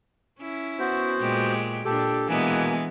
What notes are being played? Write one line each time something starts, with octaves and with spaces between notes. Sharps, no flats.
C#4 E4
B3 F#4 C5
A#2 G#3 G4
A#2 D4 G4 A4
B2 E3 G#3 A#3 B3 G#5